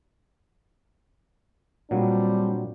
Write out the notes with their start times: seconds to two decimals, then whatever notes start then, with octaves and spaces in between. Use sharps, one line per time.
1.91 A#2 F#3 G3 C4 D4